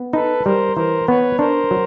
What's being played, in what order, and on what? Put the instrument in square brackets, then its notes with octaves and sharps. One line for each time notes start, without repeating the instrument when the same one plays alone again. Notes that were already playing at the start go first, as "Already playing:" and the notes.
Already playing: [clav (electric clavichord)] B3
[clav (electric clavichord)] D#4 [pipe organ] A4 B4
[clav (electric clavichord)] G3 [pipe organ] A#4 C5
[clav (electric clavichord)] E3 [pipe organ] A#4 C5
[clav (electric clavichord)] B3 [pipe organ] B4 C#5
[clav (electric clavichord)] D4 [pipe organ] A#4 C5
[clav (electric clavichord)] F#3